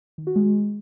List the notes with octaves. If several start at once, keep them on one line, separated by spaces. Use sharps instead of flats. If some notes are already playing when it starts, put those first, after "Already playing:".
D#3
F#4
G#3